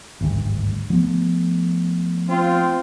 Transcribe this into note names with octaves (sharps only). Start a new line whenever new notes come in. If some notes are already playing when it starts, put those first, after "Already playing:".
G#1 D2 G2
F3 A3 B3
C4 F4